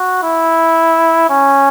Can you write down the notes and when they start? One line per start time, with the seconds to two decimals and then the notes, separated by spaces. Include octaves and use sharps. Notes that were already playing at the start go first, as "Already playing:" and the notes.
Already playing: F#4
0.23 E4
1.30 C#4